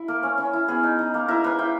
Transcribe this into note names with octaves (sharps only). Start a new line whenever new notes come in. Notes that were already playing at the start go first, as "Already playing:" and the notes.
Already playing: E4
A#3 A#4
C#4
C#4
E4
B3 G#4
D#4
D#4
A#3
E4 A#4
A#3 B4
E4 G5